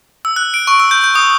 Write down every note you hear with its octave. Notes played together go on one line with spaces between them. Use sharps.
E6
F#6
D7
C#6
E6
G6
G6
D#6